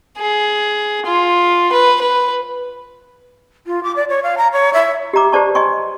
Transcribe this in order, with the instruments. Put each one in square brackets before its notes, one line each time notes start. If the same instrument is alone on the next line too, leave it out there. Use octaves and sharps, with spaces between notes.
[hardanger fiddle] G#4
F4
B4
B4
[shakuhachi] F4
D6
D5
C#5
F5
A#5
C#5
E5
[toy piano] G4 D#5 A#5 D6
G4 B4 C5 D5 A5 C#6
D#5 G#5 C6 C#6